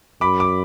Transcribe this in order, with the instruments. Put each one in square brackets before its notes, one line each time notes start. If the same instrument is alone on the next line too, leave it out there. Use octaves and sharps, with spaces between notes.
[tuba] F#2 [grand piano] B5 D6
[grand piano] D6